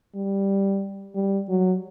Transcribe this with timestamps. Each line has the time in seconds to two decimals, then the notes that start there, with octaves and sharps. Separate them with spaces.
0.15 G3
1.15 G3
1.49 F#3